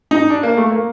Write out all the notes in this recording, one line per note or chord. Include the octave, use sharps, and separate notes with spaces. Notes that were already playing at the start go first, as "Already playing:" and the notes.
D#4
D4
A#3
A3
A#3